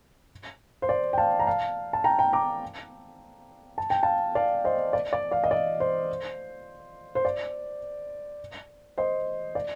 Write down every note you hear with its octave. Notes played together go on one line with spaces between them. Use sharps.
C5
D5
G5
F5 A5
A#5
F5 A5
A5
G5 A#5
G5 A#5
A#5 D6
A5
G5
F5 A5
D5 F5
C5 D#5
D5
D5
D5 F5
D#5
D5
C5
C5
D5
C5 D#5
D5